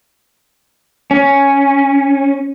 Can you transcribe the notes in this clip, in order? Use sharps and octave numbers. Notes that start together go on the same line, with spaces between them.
C#4